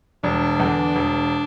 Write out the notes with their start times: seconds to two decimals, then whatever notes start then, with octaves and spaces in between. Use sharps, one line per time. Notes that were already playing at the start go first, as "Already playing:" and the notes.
0.24 E1 D4
0.60 E2 D3
0.95 E1